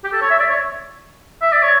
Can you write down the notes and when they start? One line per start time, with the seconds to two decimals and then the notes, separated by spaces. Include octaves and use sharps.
0.04 G4
0.13 A4
0.22 C#5
0.30 E5
0.39 D5
0.50 C#5
1.42 E5
1.53 D5
1.63 C#5